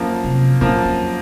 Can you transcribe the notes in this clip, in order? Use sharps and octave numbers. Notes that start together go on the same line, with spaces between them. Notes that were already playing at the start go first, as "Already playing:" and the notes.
Already playing: F#2 F3 A#3
C3
F#2 A#2 F3 A#3
F2